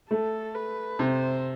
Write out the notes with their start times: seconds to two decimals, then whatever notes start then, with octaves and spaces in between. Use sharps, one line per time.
0.11 A3 A4
0.55 B4
0.99 C3 C5